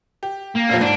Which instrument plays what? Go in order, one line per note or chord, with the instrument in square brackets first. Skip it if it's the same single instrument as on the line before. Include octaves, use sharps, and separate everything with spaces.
[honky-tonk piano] G4
[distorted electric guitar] A#3
[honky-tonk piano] F1 A#1 F3
[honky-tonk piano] G#2 [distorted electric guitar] D4